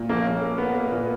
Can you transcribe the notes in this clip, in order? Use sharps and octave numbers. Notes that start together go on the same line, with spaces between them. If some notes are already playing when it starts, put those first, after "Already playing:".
Already playing: A#2
A#1 A#3
C#4
A#3
A#3 B3
A#3
A#2